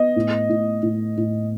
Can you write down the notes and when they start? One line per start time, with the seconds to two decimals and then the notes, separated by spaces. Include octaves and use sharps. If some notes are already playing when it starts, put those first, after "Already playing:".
Already playing: B3 D#5
0.16 A2
0.49 A2
0.82 A2
1.17 A2